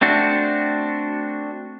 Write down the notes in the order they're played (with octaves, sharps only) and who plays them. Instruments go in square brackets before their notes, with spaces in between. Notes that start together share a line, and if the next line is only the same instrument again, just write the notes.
[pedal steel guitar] A3 C4 D4 F#4